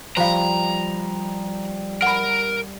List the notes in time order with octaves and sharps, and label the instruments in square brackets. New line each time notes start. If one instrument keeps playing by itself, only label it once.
[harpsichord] F3 [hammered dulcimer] G3 [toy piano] C5 F5 [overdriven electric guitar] A#5
[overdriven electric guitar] A#4 [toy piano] F#5 B5